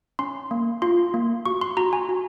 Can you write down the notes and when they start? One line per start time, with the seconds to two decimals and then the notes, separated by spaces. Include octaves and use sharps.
0.19 C#4 C6
0.51 A#3
0.82 F4 C6
1.14 A#3
1.46 F#4 C#6
1.61 C6
1.77 F#4 A#5
1.93 G#5
2.09 F#4